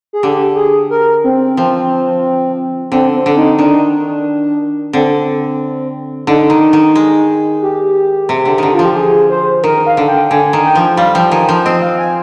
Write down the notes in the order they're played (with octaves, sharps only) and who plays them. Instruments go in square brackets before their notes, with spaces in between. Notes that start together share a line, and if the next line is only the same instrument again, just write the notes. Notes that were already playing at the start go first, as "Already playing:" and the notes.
[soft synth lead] G#4
[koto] D3 [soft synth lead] G4
[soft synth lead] G#4
A#4
C4
[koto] F3 [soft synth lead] C4
[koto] D3 [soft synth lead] C4
[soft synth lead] C4
[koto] D3
[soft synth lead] D#4
[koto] D#3 [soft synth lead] D4
[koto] D3 [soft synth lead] C4
[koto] D3 [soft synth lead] D#4
[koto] D#3
D#3
G#3
[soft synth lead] G4
[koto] C3
D3
D3 D#3
[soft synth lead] F4
[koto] F3
[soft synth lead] G4
G#4
C5
[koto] D#3 [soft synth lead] A#4
[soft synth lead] F5
[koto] D3
[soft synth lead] G5
[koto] D3 [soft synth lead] G#5
[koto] D#3
[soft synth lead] G5
[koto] F3
[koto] G3 [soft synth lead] F5
[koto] F3 [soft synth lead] G5
[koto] D#3 [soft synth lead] G#5
[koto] F3 [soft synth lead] G5
[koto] C4 [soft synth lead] D#5
[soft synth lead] F5
G#5